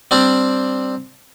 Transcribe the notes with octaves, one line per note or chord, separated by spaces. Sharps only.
G3 C4 D4